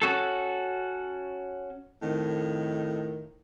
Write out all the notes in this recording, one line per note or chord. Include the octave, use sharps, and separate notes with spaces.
C#4 F#4 A4
F2 A2 D#3